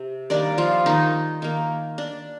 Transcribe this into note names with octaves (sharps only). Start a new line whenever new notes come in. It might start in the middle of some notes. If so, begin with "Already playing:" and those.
Already playing: C3
D#3 G3 A#3 D4 D5
F3 F4
D#3 D#4
D#3 A#3
D4